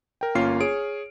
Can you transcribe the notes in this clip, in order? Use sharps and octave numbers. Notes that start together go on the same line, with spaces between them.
A#4 G5
G1 A#3 C#4 F4 F6 C7
G#4 C#5 D7